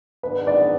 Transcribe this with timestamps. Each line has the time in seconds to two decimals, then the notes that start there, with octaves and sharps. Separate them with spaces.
0.23 G#2 D#3 B3 D4 B4
0.47 D5